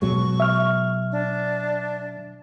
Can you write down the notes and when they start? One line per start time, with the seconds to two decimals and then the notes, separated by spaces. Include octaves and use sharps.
0.02 B2 F#3 G#3 C#6
0.40 E5 F6
1.12 D4